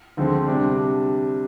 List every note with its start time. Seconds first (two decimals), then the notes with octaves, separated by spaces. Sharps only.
0.17 D2 D3 F3 G#3 C4
0.47 C3 G3 D4